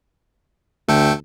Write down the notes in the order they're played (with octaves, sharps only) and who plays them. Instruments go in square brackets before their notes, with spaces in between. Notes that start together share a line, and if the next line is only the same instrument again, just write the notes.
[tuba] D2 [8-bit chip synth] A3 A4 G5